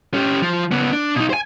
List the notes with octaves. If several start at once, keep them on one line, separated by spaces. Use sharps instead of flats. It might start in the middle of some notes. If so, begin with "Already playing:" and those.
C#4 G4
F3
C#3 B3
D4
B2 D#4
C5 G#5